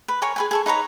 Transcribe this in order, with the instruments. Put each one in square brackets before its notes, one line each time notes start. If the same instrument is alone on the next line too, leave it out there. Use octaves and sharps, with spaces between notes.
[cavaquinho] B4
A#4 C#5 G#5 C#6
G#4 B4 G#5
G#4 A4 C#6
D#4 B4 C#5 A#5